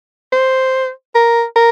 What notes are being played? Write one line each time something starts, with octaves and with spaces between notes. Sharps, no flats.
C5
A#4
A#4